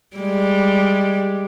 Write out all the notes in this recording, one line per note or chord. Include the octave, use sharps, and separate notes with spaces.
G3 G#3